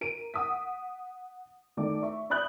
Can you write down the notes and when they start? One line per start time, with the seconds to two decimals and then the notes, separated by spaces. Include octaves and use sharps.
0.01 A#4 D7 D#7
0.34 F#5 D#6 B6
1.77 D#3 A3 D5 D6
2.02 E5 C#6
2.30 D5 E5 B5 D#6 F#6 G6